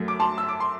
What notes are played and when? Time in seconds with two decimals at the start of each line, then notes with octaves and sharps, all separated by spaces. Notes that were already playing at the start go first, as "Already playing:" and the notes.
Already playing: F#2 F#3 A3
0.08 D6
0.20 A5 C6
0.38 E6
0.49 D6
0.60 C6